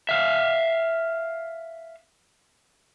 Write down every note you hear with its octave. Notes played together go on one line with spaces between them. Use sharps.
E5 F5